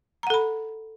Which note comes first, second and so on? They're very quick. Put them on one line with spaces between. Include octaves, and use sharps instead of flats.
A#5 F#5 A4 B5